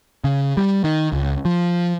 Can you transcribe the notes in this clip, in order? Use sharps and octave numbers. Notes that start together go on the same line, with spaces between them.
C#3
G3
D#3
C#2
F3